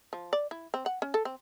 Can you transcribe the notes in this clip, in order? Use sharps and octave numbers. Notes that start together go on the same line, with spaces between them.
F3
D5
E4
C4
F#5
C#4
A4
C4